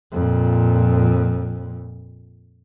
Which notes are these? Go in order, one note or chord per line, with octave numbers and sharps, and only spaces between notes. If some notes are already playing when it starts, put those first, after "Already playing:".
F2 A#2